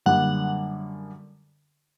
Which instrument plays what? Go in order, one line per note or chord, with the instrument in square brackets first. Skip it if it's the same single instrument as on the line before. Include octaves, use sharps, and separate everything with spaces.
[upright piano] F#2 D3 G3 A#3 [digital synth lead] F#5